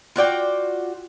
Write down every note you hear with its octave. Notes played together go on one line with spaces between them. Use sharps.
F4 F#4 D5 G5